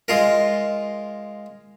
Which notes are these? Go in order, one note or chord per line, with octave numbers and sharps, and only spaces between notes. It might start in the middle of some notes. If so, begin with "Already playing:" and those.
G#3 F4 A#4